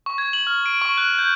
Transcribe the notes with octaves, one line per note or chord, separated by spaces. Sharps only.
C#6
G#6
F#7
F6
D7
C#6
F#6
G6